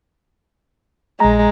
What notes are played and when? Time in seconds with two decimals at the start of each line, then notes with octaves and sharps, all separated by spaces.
1.20 A#1 G#3 A#5